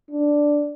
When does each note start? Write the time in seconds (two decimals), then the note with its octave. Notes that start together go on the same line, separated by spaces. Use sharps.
0.11 D4